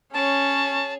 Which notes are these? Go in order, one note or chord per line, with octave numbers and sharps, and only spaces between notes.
C#4 G#4 C#5 A5